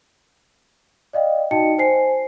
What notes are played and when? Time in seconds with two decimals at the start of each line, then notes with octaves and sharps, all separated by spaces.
1.13 D5 D#5 F5 G5
1.51 D#4 F#4 D#5 G5 A5 C#7
1.78 C5 G#5 C7